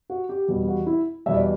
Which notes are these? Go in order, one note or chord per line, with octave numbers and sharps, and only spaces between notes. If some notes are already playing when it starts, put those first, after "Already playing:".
F#4
G4
E2 B2 G3 F#4
F#4
E4
E2 B2 G3 E5
D5